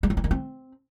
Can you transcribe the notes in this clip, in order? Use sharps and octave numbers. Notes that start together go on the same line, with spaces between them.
G#3
F#3
E3
D#3
C4